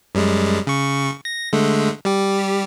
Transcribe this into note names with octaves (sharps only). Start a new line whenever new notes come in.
F#2 G3 G#3
C#3 C#6
A#6
D3 G#3 A3
G3 G4